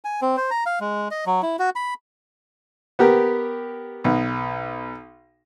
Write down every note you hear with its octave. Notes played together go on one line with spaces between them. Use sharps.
G#5
C4
C5
A#5
F5
G#3
D#5
F#3
E4
F#4
B5
B3 G4 A#4
B1